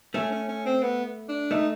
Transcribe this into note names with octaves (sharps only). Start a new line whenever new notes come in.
A3 C#4
C#4
C#4
C4
B3
D4
A3 D#4